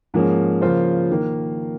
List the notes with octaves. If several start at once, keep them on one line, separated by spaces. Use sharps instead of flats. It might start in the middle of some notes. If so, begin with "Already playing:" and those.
G#2 F3 A#3 C#4 G#4
C#3 F3 A#3 F4 C5
D#3 A#3